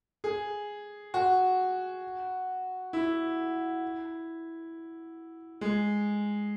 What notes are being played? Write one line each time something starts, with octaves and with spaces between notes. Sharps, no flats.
G#4
F#4
E4
G#3